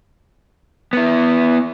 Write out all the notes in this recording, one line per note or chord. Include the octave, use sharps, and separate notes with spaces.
B3 E4